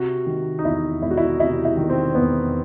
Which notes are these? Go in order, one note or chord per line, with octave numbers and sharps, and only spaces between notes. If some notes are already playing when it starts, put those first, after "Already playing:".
Already playing: C3 F#4
D#3
D#4
E2 E4
E1 E4
F#4
E4
C3 E4
E4
D#3
C4
E2 B3